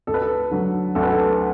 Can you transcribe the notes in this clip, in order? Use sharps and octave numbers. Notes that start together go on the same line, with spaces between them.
D2 A4
B4
A4
D3 F#3
D2 A4
B4
A4